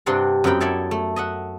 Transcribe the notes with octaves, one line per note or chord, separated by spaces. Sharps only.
G2 C3 C4 D4 F#5 C6
F#2 B3 C4 A#4 G5 B5
E4 A4 C#5 D5 E5
A3
D#5 E5 F#5